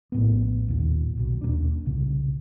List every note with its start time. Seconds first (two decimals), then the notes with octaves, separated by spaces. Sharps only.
0.12 A#1 A2 B3
0.68 D#2 A#2
1.17 B1 B2
1.41 D#2 A#3 C#4 D4
1.85 C2 A#2 C#3